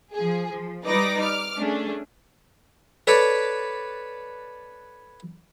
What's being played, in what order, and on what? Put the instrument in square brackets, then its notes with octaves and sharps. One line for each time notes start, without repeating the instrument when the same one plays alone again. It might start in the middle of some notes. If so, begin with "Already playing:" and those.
[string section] F3 G#4
F3
G3 D#4 B4 D5 D6 A#6
D6 F6
A3 C#4 D4 G#4
[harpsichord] A4 B4 C#5 D5